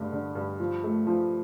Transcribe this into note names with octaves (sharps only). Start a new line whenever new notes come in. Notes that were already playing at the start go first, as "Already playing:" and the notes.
Already playing: G2 D3 A3
D3
G2
F3
A3
F3